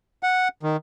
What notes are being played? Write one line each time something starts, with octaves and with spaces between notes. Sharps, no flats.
F#5
D#3